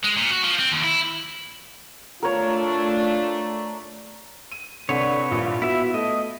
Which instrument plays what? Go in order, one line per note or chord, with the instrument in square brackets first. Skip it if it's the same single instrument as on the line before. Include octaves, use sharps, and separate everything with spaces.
[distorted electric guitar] G#3
A#2
F#4
F3
C4
D#2
E4
[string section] A3 D4 [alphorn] F4 [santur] A#4 C#5
[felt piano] D#7
[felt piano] C2 C4 [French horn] D3 [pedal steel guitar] B4 C#5
[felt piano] A#1 G2 A#2 [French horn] F4
[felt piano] B3 [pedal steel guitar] E4 E5 [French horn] F#4
[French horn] A3 [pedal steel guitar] D#5